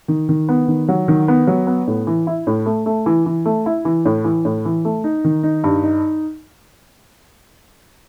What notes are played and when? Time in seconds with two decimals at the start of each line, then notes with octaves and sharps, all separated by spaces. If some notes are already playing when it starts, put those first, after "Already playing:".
0.08 D#3
0.29 D#3
0.49 B3
0.68 D#3
0.88 F#3
1.08 D#3
1.28 B3
1.47 F#3
1.67 B3
1.87 A2
2.07 E3
2.27 E4
2.47 A2
2.66 A3
2.86 A3
3.06 E3
3.26 E3
3.45 A3
3.66 E4
3.85 E3
4.05 A2
4.24 E3
4.45 A2
4.65 E3
4.85 A3
5.04 D#4
5.24 D#3
5.43 D#4
5.64 G2
5.83 D#4